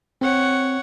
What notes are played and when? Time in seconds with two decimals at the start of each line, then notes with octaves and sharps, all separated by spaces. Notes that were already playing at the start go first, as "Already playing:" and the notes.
0.21 C4 C#5 F#5